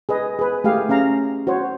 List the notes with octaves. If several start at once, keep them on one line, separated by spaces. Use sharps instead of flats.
G#4 B4 D#5
G#4 B4
A3 G4 G#4 F5
C#4 G#4 F5 A#5
F#4 C5 C#5